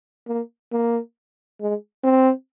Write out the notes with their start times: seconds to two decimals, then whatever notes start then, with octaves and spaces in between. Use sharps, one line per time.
0.27 A#3
0.72 A#3
1.61 G#3
2.04 C4